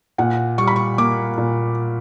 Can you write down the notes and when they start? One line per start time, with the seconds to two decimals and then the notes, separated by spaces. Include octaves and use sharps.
0.18 A#2 F#5
0.58 G3 C#6
0.67 B5
0.76 C#6
0.98 A#3 D6
1.38 A#2